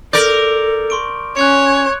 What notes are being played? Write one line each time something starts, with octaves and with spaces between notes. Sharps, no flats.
A4 A#4 D5 D6 G6
C6 C#6 D7
C#4 C#5 F#6 G#6 C#7